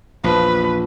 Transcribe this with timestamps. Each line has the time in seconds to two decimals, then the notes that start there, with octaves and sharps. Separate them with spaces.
0.24 A#1 E2 F3 B4